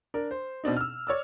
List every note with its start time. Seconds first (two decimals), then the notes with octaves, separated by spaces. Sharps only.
0.14 D4 A#4
0.31 C5
0.64 B2 C4 D4 D#4
0.77 E6 F6
1.07 C#5 D5 E6